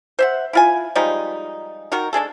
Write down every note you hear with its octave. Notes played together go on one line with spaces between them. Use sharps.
C5 E5 F#5
E4 F4 G#5
F3 G3 G#3 D#4
D#3 D#4 F#4 A#4
G#3 D4 G#4 A4